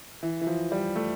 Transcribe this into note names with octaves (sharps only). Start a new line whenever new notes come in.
E3
E3
F3
G3
A3